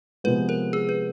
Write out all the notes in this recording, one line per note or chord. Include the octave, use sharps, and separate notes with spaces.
C3 F3 G#3 B3 B4
A#4
G#4
B4